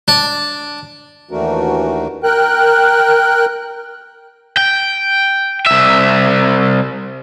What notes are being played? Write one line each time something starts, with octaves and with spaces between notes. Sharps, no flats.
D4
D#2 E3 A3 D4 F#4 A#4
A#4 G5 F#6
G5
C2 E5